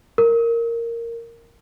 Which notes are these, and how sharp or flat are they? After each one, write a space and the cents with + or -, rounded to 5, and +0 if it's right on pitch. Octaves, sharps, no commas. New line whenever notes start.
A#4 -10